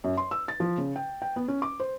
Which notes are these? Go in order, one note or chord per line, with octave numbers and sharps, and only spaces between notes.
F#2
C6
E6
A6
F3
C#3
G5
G5
B3
C#4
D6
C5